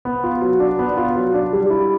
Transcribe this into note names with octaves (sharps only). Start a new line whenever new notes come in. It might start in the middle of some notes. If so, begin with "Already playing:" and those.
B3
F4
F#3
D4
B3
F4
F#3
D4
G3
E4